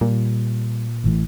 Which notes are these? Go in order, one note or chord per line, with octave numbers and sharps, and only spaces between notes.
A#2 G3
A1 E3 A3